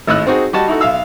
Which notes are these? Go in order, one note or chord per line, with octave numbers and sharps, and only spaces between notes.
G#1 A2 D#5 E6 F#6
C4 D#4 F#4 G#4
G3 F#4 D#5 A5
D#4 E4 F#4 A4
B1 E5 F5 E6